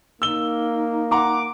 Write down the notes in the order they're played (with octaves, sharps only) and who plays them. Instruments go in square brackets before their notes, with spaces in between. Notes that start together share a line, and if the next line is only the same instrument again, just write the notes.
[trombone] A#3 [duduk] D#4 [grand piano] E6 G7
[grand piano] F#5 A#5 C6 [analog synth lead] D6